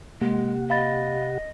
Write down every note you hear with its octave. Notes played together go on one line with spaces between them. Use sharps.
C3 G#3 A#3 G4 F#5
D#5 F5 B5 A6